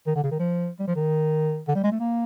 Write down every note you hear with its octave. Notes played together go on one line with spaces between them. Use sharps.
D#3
D3
C#3
D#3
F3
G3
F3
D#3
D3
G3
G#3
A3
A#3